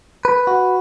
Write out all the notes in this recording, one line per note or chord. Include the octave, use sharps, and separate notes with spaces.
B4
F#4